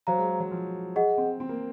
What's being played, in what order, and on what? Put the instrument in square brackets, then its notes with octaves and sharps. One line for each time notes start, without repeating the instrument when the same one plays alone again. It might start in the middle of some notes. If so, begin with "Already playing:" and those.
[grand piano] F#3 [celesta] C5 F5 A#5
[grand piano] G#3
G#3
F#3
F3
[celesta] G#4 D#5 F#5
[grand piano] C4
C4
A#3